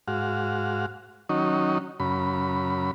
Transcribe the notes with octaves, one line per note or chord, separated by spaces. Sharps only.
G#2 F#4 F5
D#3 F#3 C#4 D#4
F#2 C#3 B5